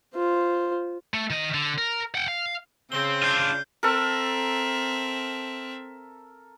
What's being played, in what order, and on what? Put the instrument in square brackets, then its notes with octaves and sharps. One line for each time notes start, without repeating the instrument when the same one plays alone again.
[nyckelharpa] F4 C5
[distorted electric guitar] A3
D#3 D#5
D3
A#4
F#5 G5
F5
[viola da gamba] C#3 [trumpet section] C4 [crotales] G7
[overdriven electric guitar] D4 F4 [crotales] F6 G6 C7
[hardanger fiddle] C4 E5 [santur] A4 A#4